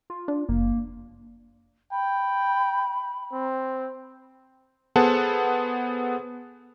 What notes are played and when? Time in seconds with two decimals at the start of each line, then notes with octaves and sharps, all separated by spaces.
0.10 F4
0.28 D4
0.49 F#1 A#3
1.92 G5 B5
3.32 C4
4.96 B3 G#4 A4 C5 F#5 A5